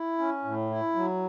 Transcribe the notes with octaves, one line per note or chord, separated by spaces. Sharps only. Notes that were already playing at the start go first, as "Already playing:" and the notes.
Already playing: E4
C#4
A2
E4
F#3